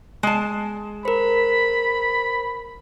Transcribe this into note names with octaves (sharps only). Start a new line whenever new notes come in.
G#3 A5
A#4 C5 B5